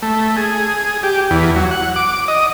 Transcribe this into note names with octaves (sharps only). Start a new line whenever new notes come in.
A3
G#4
G4
E2
F#3
F#5
D6
D#5